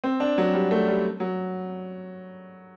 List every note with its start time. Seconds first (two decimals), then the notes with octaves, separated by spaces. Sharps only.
0.04 C4
0.20 D4
0.38 F#3
0.53 G3
0.71 A3
0.88 G3
1.20 F#3